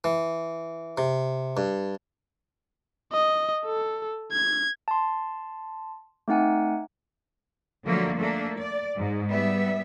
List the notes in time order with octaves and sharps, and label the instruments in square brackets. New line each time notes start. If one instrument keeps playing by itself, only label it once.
[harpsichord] E3
C3
G2
[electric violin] D#5
A4
G#6
[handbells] A5 C6
A3 C4 D#4 F#5 G#5
[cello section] D3 F3 F#3 A3 A#3
A3 A#3 D4
D5
G#2
G3 B3 E5